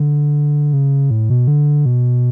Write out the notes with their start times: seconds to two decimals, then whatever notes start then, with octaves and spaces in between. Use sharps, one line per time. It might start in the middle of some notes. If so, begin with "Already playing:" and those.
Already playing: D3
0.73 C#3
1.11 A2
1.30 B2
1.47 D3
1.86 B2